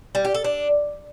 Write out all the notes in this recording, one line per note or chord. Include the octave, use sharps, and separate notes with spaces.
G3
G4
A4
D4